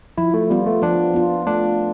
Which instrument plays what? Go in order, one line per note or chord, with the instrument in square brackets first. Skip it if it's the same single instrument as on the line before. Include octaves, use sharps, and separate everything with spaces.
[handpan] F3 [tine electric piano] E4
[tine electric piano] A3
[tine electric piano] G3 [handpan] B3 F4
[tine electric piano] A3
[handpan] F3 [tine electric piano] D4
[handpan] B3 F4
[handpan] A3 [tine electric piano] D4